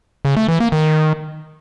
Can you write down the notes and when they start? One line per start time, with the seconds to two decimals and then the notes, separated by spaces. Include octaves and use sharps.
0.25 C#3
0.37 A3
0.48 E3
0.60 A#3
0.72 D#3